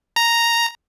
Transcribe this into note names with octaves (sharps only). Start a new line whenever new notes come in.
A#5